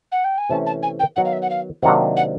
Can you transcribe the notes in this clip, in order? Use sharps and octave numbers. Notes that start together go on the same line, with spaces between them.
F#5
G5
G#5
C3 E3 A3 C#4 A5
A5
G#5
G5
D#3 F#3 B3 F#5
F5
E5
F#5
F5
C3 D#3 F#3 A#3 D4 F#5
F#5